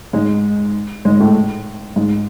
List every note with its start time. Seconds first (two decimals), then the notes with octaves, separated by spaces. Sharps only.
0.13 G#2 G#3
1.05 G#2 G#3
1.20 A2 A3
1.96 G#2 G#3